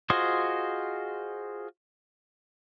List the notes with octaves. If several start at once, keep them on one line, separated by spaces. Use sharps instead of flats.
F4 F#4 G#4 C5 D#5